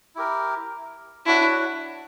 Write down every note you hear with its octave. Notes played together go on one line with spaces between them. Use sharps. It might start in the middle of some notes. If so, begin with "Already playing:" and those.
E4 G4 A#4
D4 E4 F#4 C#5 F#5